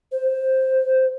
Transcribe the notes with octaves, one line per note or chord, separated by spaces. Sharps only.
C5